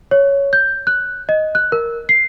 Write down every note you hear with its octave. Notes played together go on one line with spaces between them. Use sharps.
C#5
G6
F#6
D#5
F#6
A#4
C7